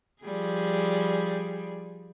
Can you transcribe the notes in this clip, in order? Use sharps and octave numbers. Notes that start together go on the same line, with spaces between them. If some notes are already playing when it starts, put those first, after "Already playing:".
F3 G3 G#4